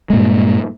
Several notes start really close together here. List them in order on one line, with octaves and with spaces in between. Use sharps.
G#3 A#2 G2